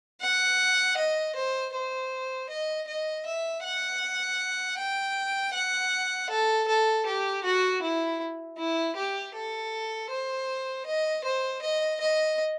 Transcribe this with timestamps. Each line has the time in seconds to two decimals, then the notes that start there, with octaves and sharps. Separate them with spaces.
0.21 F#5
0.97 D#5
1.36 C5
1.74 C5
2.50 D#5
2.88 D#5
3.26 E5
3.63 F#5
4.78 G5
5.54 F#5
6.30 A4
6.68 A4
7.06 G4
7.44 F#4
7.82 E4
8.58 E4
8.97 G4
9.35 A4
10.10 C5
10.86 D#5
11.25 C5
11.62 D#5
12.01 D#5